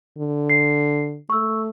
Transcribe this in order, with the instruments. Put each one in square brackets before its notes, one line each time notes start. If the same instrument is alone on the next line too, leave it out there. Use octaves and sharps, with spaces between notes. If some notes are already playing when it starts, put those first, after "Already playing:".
[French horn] D3
[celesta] C7
[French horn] A3 [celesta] C#6 E6